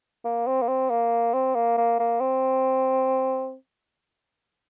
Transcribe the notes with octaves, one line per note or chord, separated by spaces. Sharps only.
A#3
C4
A#3
C4
A#3
C4
A#3
A#3
A#3
C4